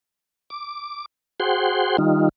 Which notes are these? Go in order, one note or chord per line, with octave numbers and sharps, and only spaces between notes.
D6
F#4 G#4 C5 F#5 G5 C6
D#3 G3 D#4 F4